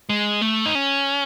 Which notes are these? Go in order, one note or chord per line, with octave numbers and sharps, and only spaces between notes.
G#3
A3
D#4
C#4